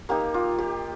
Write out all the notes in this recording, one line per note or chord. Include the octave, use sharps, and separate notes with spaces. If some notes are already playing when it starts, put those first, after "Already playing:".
A#3 D#4 G4
F4
G4